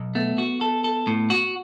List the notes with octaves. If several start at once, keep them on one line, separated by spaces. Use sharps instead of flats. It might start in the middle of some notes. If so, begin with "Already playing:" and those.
Already playing: B1
A3 B3
F#4
A4
A4
A2
F#4